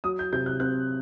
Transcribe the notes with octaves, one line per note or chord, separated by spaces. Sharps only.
F#3 D#6
G6
C3 G6
F#6
C4 F#6